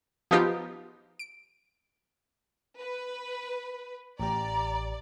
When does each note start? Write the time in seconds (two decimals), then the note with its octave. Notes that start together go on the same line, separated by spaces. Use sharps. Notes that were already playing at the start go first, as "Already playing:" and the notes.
0.31 F3 B3 D#4 F4 G4
1.19 D7
2.78 B4
4.20 A1 G4 D5 A#5